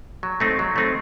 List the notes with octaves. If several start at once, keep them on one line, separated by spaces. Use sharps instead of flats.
F#3
A3 C4 D#4
F#3
A3 C4 D#4